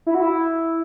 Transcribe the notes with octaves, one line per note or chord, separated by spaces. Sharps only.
E4
F#4
E4